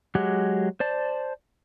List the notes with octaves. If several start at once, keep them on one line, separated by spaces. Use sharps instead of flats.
F#3 G#3 G4 F#5
C5 D5 A5